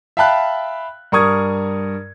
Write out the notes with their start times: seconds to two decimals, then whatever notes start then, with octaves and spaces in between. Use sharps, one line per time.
0.17 E5 F5 G5 A5 B5 F#6
1.12 G2 A#4 C#6 D#6 G#6